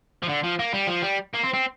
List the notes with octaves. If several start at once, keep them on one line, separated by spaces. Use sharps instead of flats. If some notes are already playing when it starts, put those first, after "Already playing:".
F3
D3
F3
A#3
G3
F3
G3
A#3
C4
C4